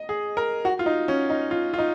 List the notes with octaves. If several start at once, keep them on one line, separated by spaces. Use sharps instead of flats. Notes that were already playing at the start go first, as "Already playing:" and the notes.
Already playing: D#5
G#4
A#4
F#4
F4
D#4
C#4
D#4
F4
F4
D#4